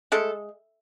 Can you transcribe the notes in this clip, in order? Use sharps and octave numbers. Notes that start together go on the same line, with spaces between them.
G#3 A3 A4